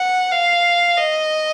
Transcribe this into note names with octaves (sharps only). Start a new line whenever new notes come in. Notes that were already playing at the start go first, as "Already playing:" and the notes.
Already playing: F#5
F5
D#5